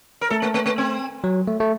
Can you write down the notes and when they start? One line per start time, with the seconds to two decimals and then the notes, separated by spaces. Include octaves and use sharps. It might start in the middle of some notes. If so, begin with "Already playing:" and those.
0.21 A#4
0.30 A3 A4
0.42 A#3
0.54 A#3
0.66 A#3
0.78 C4
1.24 F#3
1.47 A3
1.60 A3